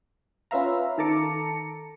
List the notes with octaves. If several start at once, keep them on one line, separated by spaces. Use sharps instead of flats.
C#4 F4 B4 E5 F5 A#5
D#3 A4 A5 A#5 D6 C#7